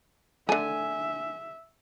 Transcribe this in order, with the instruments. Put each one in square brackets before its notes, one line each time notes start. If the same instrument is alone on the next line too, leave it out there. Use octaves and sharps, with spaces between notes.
[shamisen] D3 A3 [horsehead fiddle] E5 [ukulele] G#5